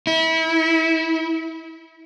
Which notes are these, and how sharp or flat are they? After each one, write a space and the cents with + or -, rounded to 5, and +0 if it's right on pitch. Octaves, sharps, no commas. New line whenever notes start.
E4 -30